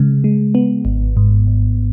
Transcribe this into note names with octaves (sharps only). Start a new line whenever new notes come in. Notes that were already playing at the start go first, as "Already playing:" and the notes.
Already playing: C#3 G#3
G#3
B3
G#1
G#2
G#1